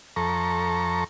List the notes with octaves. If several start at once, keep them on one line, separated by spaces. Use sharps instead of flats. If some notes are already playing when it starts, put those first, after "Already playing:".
F2 A4 A#5 C#6